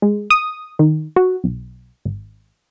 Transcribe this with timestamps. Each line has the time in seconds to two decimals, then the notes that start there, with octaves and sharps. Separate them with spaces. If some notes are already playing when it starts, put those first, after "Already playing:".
0.02 G#3
0.30 D#6
0.79 D#3
1.16 F#4
1.44 B1
2.05 G#1